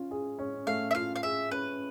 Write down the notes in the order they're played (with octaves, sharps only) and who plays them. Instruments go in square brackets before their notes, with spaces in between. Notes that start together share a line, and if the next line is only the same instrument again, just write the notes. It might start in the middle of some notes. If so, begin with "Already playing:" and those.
Already playing: [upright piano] C#4 F4
G#4
C#4
[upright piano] A3 [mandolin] F5
[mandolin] E5
[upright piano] F4 [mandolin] F5
[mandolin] F5
[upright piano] G#4 [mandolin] E5
[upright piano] C#4 [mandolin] B4